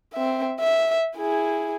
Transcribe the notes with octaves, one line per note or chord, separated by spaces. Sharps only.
C4 E5
E5
E4 G#4